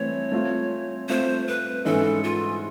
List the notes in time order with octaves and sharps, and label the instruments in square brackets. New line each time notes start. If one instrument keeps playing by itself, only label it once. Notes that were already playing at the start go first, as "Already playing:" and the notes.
Already playing: [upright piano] E3 A3 C4 [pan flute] C#5
[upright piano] A3 C4 F4
[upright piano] A3 C4 F4 [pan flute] C5
[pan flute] B4
[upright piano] G#2 E3 G#3 C#4 E4 [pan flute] A4
[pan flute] F4